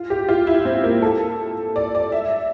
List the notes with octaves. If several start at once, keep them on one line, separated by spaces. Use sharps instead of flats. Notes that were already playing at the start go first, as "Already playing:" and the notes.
Already playing: F4
G4
F4
E4
C4
A#3
A4
D5
D5
E5